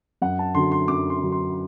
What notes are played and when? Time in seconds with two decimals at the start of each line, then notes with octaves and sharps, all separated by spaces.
0.22 F#2 F#5
0.39 A5
0.55 D3 F#3 C6
0.72 C6
0.88 F#2 D6
1.10 C6
1.20 D3 F#3
1.32 C6